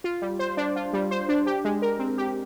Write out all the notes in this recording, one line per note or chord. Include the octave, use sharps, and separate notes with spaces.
F4
G3
C5
D4
F4
G3
C5
D4
G4
G#3
A#4
C4
G4